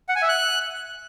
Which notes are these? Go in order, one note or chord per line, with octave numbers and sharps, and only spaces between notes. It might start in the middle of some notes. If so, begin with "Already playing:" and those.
F#5
G#5
E5
F#6